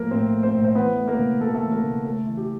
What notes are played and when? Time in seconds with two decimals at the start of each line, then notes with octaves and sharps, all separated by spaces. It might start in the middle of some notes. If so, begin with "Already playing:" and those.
Already playing: A2 F3 A3 A#3 A#4
0.11 A2 C4 C5
0.33 A3
0.43 C4 C5
0.55 A2
0.64 C5
0.75 E3 B3 B4
0.97 A3
1.08 A#3 A#4
1.19 C#3
1.41 C#3 A4
1.47 A#4
1.54 A3 A4
1.62 E3
1.72 A#3 A#4
1.84 C#3
2.04 A3 A4
2.27 E3
2.37 G4